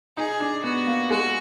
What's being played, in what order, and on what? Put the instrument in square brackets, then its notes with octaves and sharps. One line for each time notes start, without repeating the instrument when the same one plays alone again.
[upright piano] D#4 [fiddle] G#4
[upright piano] D4
[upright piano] B3 [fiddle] F#4
[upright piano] A#3
[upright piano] G#3 [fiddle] F#4